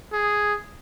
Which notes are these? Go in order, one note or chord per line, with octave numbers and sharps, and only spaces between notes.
G#4